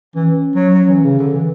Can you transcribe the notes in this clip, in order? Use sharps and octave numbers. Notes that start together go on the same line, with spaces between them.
E3 C#4
F#3
F#3
E3
C#3
D3
E3